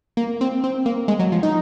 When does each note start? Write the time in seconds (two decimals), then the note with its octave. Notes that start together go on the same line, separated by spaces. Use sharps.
0.17 A#3
0.41 C4
0.64 C4
0.86 A#3
1.08 G#3
1.19 F#3
1.32 F3
1.43 D#4